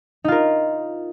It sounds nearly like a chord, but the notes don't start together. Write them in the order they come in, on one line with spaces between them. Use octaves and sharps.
D#4 F4 A#4